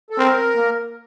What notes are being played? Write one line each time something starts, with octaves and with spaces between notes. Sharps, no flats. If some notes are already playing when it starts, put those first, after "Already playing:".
A4
C4 A#4
A#3